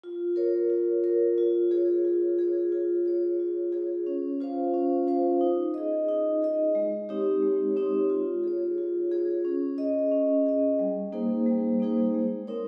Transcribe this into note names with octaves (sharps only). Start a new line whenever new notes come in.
F4
A#4 C#5
F4
A#4 C#5
F4
G#4 C#5
F4
G#4 C#5
F4
G#4 C#5
F4
G#4 C#5
C#4
F4 C5 F5
C#4
F4 C5 F5
D#4
G#4 D#5
D#4
G#4 D#5
G#3
C4 D#4 G4 C#5
G#3
C4 D#4 G4 C#5
F4
G#4 C#5
F4
G#4 C#5
C#4
G#4 D#5
C#4
G#4 D#5
G3
A#3 D#4 G#4 C5
G3
A#3 D#4 G#4 C5
G#3
C4 D#4 A#4 C#5